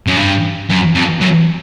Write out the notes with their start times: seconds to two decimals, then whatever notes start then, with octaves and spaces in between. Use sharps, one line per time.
0.07 F#2
0.17 G2
0.69 F#2
0.95 F2
1.21 F#2